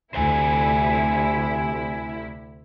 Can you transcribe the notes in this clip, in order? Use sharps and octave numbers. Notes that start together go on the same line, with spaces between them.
D2 C3 E4 C5 E5 G#5